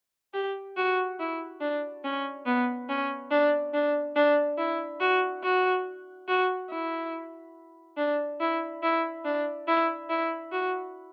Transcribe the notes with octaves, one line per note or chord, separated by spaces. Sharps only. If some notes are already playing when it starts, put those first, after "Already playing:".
G4
F#4
E4
D4
C#4
B3
C#4
D4
D4
D4
E4
F#4
F#4
F#4
E4
D4
E4
E4
D4
E4
E4
F#4